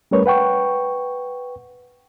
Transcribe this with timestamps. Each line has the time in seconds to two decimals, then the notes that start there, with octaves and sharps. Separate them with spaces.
0.11 G3 A3 C#4 A#4 B4 C#5
0.26 B4 F#5 G5 C#6